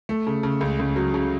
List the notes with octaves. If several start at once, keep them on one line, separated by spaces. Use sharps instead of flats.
A3
C#3
C#3
C#2
C#2
F#3
C#3